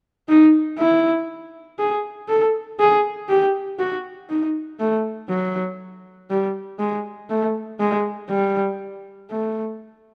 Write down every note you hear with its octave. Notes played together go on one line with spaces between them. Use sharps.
D#4
E4
G#4
A4
G#4
G4
F#4
D#4
A3
F#3
G3
G#3
A3
G#3
G3
A3